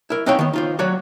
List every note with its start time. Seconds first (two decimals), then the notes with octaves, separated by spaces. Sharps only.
0.10 E4 A#4
0.26 C4 D#4 B4 C#5 F5 G5
0.39 D#3 B3
0.53 D#4 F4 C5
0.79 F#3 F#4 C#5 D5